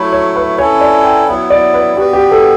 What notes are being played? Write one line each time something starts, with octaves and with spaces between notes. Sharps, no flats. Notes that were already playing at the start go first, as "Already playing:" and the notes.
Already playing: F#3 A3 E4
C#5
B4
C#4 E4 A4 C#5
D5
G5
F#3 B3 E4 F#5
D5
B4
B3 F#4 G4 B4
G4
A4